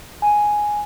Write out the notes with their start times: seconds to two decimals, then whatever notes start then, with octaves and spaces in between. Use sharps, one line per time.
0.22 G#5